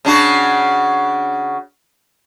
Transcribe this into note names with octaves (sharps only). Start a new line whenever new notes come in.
C#3 D4 F#4